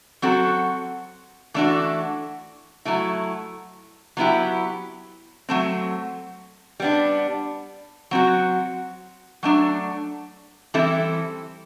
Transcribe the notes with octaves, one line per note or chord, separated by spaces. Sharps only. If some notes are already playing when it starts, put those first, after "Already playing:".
F#3 C4 F#4 A4
E3 A3 D4 F#4
F#3 A3 E4
F#3 B3 E4 G4
F#3 A3 C4
G3 B3 D4
F#3 C4 F#4
F#3 A3 D4
E3 G3 C4 E4 A4